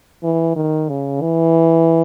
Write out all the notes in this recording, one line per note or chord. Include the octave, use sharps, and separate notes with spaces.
E3
D#3
C#3
E3